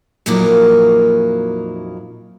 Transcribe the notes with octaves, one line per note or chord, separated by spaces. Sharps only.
F2 A#2 F#3 A#3 D#4 E4